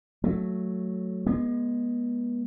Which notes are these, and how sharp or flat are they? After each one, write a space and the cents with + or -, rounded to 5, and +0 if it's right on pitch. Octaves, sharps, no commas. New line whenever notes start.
F#3 +0 A3 +0
G#3 +0 B3 -35